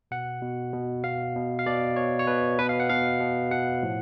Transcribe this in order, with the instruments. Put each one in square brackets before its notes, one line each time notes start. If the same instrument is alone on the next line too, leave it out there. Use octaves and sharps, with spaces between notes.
[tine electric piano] B2 F#5
B2
B2
B2 F5
B2
F5
B2 D5
B2 C#5
C#5
B2 B4
B2 B4
F5
F#5
B2 F5
B2
B2 F#5
A2 F3